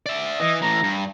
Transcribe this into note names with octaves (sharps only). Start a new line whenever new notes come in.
D5 E5
E3 D#5
A2 E3 A#5
G2